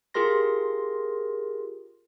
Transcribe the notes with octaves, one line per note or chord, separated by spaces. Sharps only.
F4 G4 G#4 A#4 C6 A#6